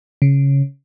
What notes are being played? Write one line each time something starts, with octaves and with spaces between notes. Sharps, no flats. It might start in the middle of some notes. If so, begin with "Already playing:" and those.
C#3